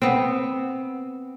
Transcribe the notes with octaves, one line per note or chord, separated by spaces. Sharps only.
B3 C4